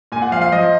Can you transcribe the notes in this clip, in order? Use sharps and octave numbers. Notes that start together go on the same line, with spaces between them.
A#2 G#5
F#5
F3 F5
F5
F3 D#5